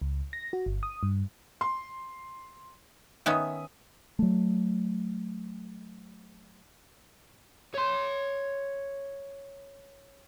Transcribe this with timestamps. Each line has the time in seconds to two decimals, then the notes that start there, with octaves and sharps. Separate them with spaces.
0.02 C#2
0.33 A#6
0.53 F#4
0.66 G1
0.83 D#6
1.03 G2
1.61 C6
3.26 D#3 B3 C#4 E5 D#6
4.19 F#3 A3
7.74 C#5 C6